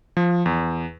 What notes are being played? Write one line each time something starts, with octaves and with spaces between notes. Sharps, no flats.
F3
E2